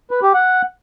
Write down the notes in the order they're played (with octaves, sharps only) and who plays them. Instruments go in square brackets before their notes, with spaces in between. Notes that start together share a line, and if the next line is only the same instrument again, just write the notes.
[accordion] B4
G4
F#5